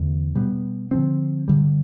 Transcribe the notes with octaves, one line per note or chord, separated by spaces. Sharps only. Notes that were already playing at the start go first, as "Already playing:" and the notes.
Already playing: E2 D3 A3
B2 G3 B3
D3 F3 C4
G2 D3 G3